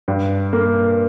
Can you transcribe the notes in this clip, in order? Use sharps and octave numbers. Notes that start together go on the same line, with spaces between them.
G2
A#3